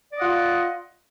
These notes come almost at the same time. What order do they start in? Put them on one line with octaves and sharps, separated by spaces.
D5 D#5 F#5 F4